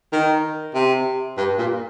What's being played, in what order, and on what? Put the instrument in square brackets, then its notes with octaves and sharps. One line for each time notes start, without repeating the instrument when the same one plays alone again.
[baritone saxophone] D#3
C3
G2
A#2